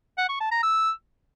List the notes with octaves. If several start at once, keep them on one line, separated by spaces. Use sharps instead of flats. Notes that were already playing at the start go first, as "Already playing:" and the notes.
F#5
C#6
A5
A#5
E6